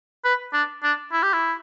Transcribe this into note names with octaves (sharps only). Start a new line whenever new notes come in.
B4
D4
D4
E4
G4
E4